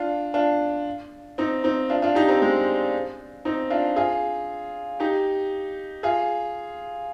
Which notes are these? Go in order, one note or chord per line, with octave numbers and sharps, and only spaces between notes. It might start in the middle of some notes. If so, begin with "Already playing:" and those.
Already playing: D4 F4
D4 F4
C4 D#4
C4 D#4
D4 F4
D4 F4
D#4 G4
C4 D#4
G#3 C4
C4 D#4
D4 F4
F4 G#4
D#4 G4
F4 G#4